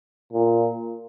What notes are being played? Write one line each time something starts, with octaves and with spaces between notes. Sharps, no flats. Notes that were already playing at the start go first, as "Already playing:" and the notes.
A#2